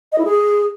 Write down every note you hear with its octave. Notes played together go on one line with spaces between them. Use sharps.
D#5
E4
G#4